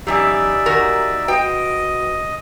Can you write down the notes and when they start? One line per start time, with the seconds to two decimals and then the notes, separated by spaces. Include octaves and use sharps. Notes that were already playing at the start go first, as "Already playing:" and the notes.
0.07 F#2 E3 D#4 G4 D5 E5 G#5
0.66 D#3 F#4 A#4
1.28 F#4 B4 D#5 G5